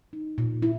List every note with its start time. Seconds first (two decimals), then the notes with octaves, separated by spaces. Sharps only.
0.13 D#4
0.38 A#2
0.62 E4